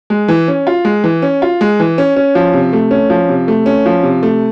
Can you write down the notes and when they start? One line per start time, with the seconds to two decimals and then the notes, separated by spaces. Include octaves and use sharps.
0.10 G#3
0.28 E3
0.48 C#4
0.67 F4
0.85 G#3
1.04 E3
1.22 C#4
1.42 F4
1.61 G#3
1.80 E3
1.98 C#4
2.16 C#4
2.35 F3
2.53 C3
2.73 A3
2.91 C#4
3.10 F3
3.29 C3
3.48 A3
3.66 C#4
3.86 F3
4.03 C3
4.23 A3